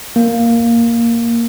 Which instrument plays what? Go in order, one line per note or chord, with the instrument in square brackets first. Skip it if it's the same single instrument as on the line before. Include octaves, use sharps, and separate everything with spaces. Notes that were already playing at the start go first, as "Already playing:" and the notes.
[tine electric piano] A#3